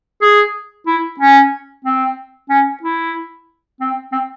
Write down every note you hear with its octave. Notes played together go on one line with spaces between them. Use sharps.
G#4
E4
C#4
C4
C#4
E4
C4
C4